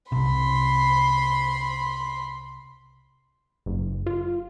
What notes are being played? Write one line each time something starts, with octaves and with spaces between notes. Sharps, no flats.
C2 C3 B5 C6
F#1
F4